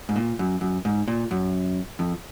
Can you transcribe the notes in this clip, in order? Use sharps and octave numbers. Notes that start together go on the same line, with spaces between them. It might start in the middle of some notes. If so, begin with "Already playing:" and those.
G#2
A#2
F#2
F#2
G#2
A#2
F#2
F2